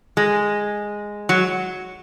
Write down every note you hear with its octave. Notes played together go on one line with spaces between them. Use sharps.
G#3
F#3